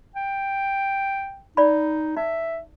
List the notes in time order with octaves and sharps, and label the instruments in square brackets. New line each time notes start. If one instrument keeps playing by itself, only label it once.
[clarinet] G5
[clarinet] D#4 [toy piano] D5 B5
[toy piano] D#4 [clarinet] E5